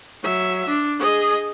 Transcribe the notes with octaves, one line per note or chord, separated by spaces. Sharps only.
F#3 E5
D4
G#4 D#5